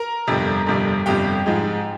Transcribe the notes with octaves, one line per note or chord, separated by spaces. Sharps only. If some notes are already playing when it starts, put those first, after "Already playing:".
Already playing: A#4 A#5
G1 F2 C3 G3
G1 F2 C3 G3
G1 F2 C3 G3 G4 G5
G#2 F3 G#3 D#4